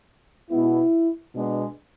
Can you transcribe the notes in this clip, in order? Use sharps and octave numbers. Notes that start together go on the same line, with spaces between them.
B2 G#3 B3 E4
B2 G#3 B3 D4